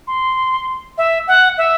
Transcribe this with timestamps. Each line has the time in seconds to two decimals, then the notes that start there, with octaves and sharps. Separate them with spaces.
0.07 C6
0.98 E5
1.28 F#5
1.58 E5